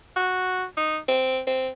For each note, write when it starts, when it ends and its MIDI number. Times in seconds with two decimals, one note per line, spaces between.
0.17 0.65 66
0.77 0.98 63
1.08 1.40 60
1.47 1.69 60